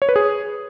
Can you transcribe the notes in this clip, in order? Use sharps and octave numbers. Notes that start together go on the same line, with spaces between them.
C#5
B4
G#4